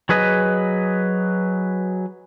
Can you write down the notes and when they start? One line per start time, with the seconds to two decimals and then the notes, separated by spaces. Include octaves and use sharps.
0.09 F#3 G#4 B4 D#5